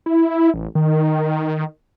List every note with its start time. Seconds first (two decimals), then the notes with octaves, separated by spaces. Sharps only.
0.06 E4
0.54 A1
0.75 D#3